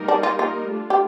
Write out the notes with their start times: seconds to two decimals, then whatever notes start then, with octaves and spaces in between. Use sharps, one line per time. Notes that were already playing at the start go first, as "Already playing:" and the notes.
Already playing: G3 A#3 D#4 A#4
0.08 D4
0.23 F4
0.39 F4
0.70 A3 D4 F4
0.90 G4